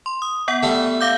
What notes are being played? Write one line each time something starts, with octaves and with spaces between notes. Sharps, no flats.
C6
D#6
B3 F#5
G3 A3
F5 D6 G6